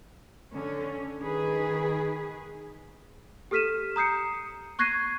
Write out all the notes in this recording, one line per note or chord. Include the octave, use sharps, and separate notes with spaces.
D3 C#4
D#3 G#4 B4
G4 A4 F6 B6 D#7 E7
A#5 D#6 G6 C7 C#7
C#6 F#6 G#6 A#6 C7 D#7